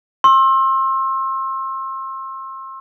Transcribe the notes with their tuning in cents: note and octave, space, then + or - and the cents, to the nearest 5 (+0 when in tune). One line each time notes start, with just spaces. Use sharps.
C6 +35 E6 +0